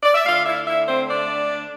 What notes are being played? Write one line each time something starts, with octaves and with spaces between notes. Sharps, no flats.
D5
E5
D3 A3 F4 F5
E4 E5
E4 E5
C4 C5
D4 D5